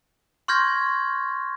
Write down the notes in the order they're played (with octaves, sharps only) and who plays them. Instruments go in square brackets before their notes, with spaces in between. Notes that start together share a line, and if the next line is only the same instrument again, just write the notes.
[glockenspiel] C6 C#6 F6 G6 G#6 A#6